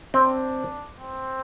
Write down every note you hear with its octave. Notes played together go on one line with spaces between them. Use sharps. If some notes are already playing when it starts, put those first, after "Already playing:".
C4 D4
C4